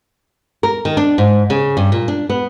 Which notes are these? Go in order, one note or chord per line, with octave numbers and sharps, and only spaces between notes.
A#4
D#3
D4
G#2
C#3
G2
A#2
D4
B3